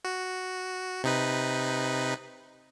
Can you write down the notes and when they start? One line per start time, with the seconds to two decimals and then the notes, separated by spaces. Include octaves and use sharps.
0.05 F#4
1.04 C3 D#4 B4